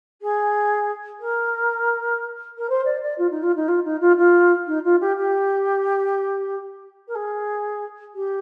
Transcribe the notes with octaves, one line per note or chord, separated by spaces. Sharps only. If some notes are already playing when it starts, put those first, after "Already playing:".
G#4
A#4
A#4
C5
D5
D5
F4
D#4
F4
D#4
F4
D#4
F4
F4
D#4
F4
G4
G4
A#4
G#4
G4